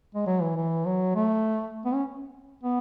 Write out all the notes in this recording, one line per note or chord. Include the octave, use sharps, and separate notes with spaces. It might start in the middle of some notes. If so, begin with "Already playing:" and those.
G#3
F#3
E3
E3
F#3
A3
B3
C#4
B3